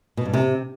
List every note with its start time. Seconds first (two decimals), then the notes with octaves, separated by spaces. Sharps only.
0.17 B2
0.25 G2
0.34 C3